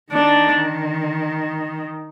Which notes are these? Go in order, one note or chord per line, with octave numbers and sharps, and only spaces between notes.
D#3 D4